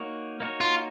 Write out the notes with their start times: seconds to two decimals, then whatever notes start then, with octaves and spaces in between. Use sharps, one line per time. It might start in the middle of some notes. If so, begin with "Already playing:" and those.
Already playing: A#3 D#4 F#4 A#4 C#5
0.40 A#3 D#4 F#4 A#4 C#5
0.61 F4